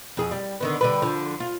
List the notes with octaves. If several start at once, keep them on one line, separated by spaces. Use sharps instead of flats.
F2 G#4
G3
D3 D#3 B3
D3 G3 B4
D3 F3
F4